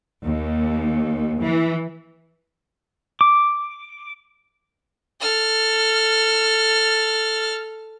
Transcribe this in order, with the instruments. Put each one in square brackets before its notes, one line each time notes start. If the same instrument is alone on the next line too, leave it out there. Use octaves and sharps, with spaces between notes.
[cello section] D#2
E3
[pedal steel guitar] D6
[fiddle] A4 F6